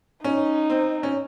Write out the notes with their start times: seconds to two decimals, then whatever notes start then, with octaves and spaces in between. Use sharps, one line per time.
0.24 C#4 D#4
0.70 C4
1.03 C#4